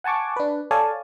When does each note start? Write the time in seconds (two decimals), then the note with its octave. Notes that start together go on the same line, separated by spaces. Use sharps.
0.04 F#5 G#5 A5 C#6 D6
0.36 D4 B4
0.71 A4 C#5 D5 F5 G#5 A5